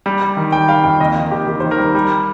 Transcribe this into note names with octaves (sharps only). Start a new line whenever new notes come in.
G3
G3
D#3
G3 G5
G3 F5
F2 G5
D#2 D#5
D#3 A#4
D#2 G4
D#3 G4
D#3 C5
A#4
G3
G3